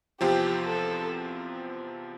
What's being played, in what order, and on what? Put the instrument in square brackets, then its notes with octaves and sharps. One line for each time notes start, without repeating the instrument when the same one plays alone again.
[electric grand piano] E2 C3 F3 C4 F4 [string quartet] G4
[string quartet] A4